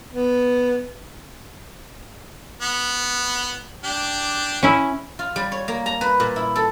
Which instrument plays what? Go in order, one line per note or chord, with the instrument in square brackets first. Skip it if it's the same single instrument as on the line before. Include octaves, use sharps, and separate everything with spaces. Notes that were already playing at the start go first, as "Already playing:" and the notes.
[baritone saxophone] B3
[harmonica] B3
D4 G4
[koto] C#4 E4
[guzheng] F4
G3
C#5
A#3
A#5
B4
A#2
E4
A4